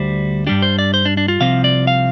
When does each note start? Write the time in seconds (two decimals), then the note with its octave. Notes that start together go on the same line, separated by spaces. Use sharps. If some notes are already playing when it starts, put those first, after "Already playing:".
Already playing: D2 G3 C5
0.47 G2 G3 D4 G4
0.62 C5
0.79 D5
0.94 C5
1.05 D4
1.17 D4
1.28 F4
1.40 C2 C3 F3 C4 F5
1.64 D5
1.87 F5